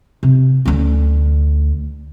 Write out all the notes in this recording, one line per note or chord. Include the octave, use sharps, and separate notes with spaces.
C3
D2 C#4